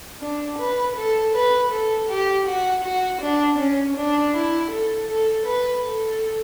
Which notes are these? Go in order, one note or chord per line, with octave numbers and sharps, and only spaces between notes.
D4
B4
A4
B4
A4
G4
F#4
F#4
D4
C#4
D4
E4
A4
A4
B4
A4